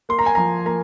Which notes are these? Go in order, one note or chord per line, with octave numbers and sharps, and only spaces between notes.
A#3 C6
A#5
G#5
F3 A#5
A#3 A#5